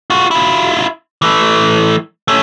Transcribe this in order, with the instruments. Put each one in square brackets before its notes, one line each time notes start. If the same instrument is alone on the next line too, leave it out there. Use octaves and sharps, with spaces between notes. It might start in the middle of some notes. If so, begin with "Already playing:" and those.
[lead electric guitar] F4 F#4
E4 F4
E3 A3
A3 C#4